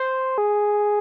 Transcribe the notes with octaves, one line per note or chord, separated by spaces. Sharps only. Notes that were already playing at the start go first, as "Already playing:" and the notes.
Already playing: C5
G#4